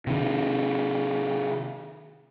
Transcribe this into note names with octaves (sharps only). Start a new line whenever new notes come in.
C3 D#3